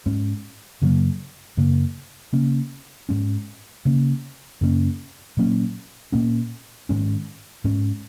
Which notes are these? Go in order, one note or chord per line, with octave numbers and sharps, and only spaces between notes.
G#2 G#3 C#4
F#2 C#3 F#3 A#3
F#2 C#3 A#3
C#3 A#3 C#4
G#2 G#3 C#4
C#3 A#3 C#4
F#2 C#3 A#3 C#4
A#2 F#3 A#3 C#4
A#2 A#3 C#4
G#2 D#3 G#3 C#4
G#2 G#3 C#4